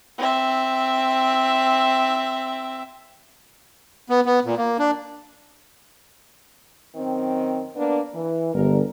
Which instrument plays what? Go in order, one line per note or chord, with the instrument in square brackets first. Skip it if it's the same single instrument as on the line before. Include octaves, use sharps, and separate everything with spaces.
[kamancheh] C4 E5
[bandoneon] B3
B3
A#2
A#3
D4
[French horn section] F#2 D#3 C4
A#3 B3 D4
E3
[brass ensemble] G1 [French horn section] A#4